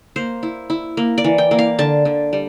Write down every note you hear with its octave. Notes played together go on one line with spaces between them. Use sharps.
A#3 C5
E4
E4
A#3
D5
E3
G5
A#3
F5
D3 A5
D3
G3